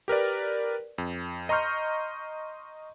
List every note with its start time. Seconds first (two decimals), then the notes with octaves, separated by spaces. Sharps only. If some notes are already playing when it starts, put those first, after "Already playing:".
0.08 G4 A#4 B4 D5
0.98 F2
1.49 D#5 A#5 C6 C#6 F6 G6